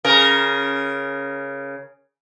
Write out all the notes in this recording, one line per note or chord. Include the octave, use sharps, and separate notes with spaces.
C#3 A#4